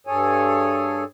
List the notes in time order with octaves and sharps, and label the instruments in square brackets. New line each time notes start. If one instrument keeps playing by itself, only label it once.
[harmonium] G2 G#4 A4 C#5 G#5